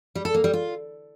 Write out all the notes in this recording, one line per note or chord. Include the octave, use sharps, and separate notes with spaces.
G3
A4
A#3
G3
F4